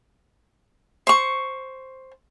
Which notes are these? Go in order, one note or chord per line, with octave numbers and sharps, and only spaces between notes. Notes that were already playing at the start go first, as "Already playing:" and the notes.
C5 C#6